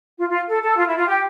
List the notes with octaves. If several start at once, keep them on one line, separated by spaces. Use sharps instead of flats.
F4
F4
A4
A4
F4
E4
F4
G4